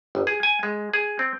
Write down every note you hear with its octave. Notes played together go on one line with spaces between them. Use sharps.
G1
G#4
G#5
G#3
G#4
C4